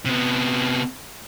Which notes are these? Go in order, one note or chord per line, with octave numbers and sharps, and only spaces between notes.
C3 B3